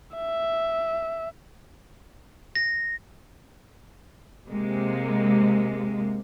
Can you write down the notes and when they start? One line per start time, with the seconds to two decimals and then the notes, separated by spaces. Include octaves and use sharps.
0.16 E5
2.55 A#6
4.48 C3 G#3 A#3